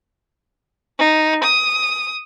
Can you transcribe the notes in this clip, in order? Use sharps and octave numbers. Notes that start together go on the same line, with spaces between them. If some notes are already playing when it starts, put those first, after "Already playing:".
D#4
D#6